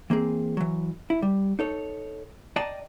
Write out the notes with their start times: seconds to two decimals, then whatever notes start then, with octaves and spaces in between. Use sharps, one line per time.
0.10 E3 A#3 C4 G#4
0.57 E3 F#3
1.10 E4
1.22 G3
1.59 D#4 A4 C#5
2.56 D5 D#5 G5 A5 A#5